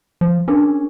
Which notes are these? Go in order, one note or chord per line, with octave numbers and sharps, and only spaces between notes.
F3
C#4 D4 G#4 A#4